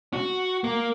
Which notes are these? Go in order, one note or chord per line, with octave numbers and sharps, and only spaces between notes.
F#4
A#3